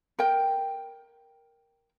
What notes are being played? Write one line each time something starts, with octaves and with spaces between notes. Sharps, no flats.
A#4 G5